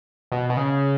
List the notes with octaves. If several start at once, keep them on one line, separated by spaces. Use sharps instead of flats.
B2
B2
C#3